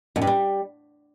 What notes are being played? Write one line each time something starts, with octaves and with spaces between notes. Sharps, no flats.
F#2
G2
G3